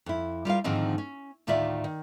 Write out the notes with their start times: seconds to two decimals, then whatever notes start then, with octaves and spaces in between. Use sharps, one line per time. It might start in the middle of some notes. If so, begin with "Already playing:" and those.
0.06 F2 E4
0.45 G3 F4 A#4 F5
0.64 G#2 D3 D#3 F3 C4 D#4
0.98 C#4
1.47 D2 A2 D#3 F4 D5 E5
1.84 D#3